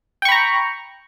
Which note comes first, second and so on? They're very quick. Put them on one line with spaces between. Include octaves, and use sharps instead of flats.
G5 C#6 B5 A#5